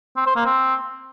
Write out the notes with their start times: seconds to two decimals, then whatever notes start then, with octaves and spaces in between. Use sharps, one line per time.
0.17 C4
0.26 C5
0.36 A#3
0.46 C4